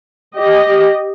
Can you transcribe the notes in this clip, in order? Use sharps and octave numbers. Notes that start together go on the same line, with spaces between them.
G4 D#5